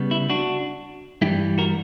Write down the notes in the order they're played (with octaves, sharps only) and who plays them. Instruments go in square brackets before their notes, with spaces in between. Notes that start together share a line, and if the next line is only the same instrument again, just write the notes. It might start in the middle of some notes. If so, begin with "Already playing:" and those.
Already playing: [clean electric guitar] C#3 G3 B3
E4
D4 F#4
G2 E3 G3 E4 G4
F#4 A#4